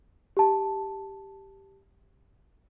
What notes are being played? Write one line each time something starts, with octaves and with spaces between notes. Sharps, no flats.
G4 A5